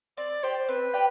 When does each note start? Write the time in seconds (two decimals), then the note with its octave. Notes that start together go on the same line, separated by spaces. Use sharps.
0.17 C4 D5
0.43 G4 C5 D5 G5
0.69 C4 B4
0.94 G4 D5 G5